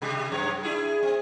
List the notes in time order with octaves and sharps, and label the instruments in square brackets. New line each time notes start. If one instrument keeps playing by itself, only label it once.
[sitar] C3 G#3 G4
F#2 C#5
D4 E4 G#4
C4